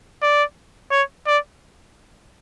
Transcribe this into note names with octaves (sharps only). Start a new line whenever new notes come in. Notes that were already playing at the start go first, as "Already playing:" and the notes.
D5
C#5
D5